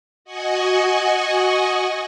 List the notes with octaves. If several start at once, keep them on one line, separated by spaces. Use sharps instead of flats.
F#4 D#5 F#5 G#5 C#6 D#6